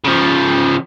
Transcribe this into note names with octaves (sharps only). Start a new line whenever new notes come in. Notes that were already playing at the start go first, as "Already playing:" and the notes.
C#3 F3